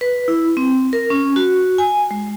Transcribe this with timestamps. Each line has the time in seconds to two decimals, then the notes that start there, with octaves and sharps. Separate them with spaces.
0.01 B4
0.28 E4
0.57 C4
0.93 A#4
1.10 C#4
1.36 F#4
1.78 G#5
2.11 G#3